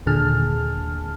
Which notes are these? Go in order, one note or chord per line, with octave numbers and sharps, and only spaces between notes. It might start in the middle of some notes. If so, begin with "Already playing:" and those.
D#2 A#2 D3 G#4 A5 F6